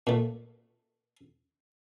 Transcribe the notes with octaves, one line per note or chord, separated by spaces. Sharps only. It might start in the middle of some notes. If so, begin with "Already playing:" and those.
A#2 A3